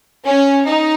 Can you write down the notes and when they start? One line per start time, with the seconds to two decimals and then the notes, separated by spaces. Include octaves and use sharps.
0.25 C#4
0.66 D#4